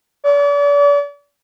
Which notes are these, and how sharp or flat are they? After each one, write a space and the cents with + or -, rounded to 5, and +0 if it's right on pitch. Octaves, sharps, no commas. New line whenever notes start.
D5 -40